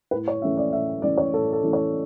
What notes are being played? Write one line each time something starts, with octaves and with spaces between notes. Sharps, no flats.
A2 B4
C#5
E3 A3 C#4 E4 E5
D5
A2 E5
E3 A3 C#4 E4 D5
C#5
A2 A4
A4
E3 A3 C#4 E4
C#5